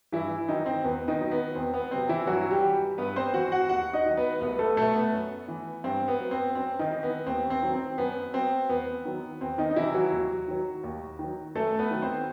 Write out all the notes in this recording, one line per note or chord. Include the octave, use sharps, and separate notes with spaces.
G2 E3 E4
D#3 F#3 D#4
C4
E2 B3
D#3 D#4
D#3 F#3
B3
E2 C4
B3
C3 F#3 C4
E3 E4
G2 F#3 F#4
G3 G4
E3
G2 B3 B4
C4 C5
E3 F#4 F#5
F#4 F#5
D#2 F#4 F#5
D#4 D#5
D#3 F#3
B3 B4
C2 B3 B4
A3 A4
B2 F#3 A3 A4
B3
F#2
E3
G2 C4
B3
F#3
C4
F#2 C4
D#3 D#4
E3
B3
D#2 C4
C4
D#3 F#3
C4
F#2 B3
F#3 C4
E2 B3
D#3 F#3
E2 C4
D#3 D#4
D#4
C3 E3 F#3 E4
F#3 F#4
D#2
D#3 F#3
D#2
D#3
F#3
F#2 A3 A4
B3 B4
D#3 F#3
C4 C5